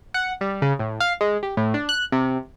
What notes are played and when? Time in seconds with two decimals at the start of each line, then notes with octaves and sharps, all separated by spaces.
0.14 F#5
0.41 G3
0.62 C#3
0.79 A2
1.00 F5
1.21 G#3
1.43 G4
1.57 A2
1.74 D4
1.89 F#6
2.12 C3